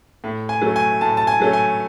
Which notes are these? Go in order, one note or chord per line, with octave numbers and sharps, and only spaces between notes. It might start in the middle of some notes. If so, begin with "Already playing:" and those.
A2
G#5
F#3 A3 C#4
G#5
A2 A5
A5
G#5
F#3 A3 C#4
G#5